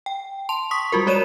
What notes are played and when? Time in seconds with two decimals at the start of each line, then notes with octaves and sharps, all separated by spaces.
0.06 G5
0.49 A5 C6 F7
0.71 C#6 D#6 B6
0.92 G3 F4 F#4 A#4
1.07 G#3 F#4 C#5 D5 D#7 E7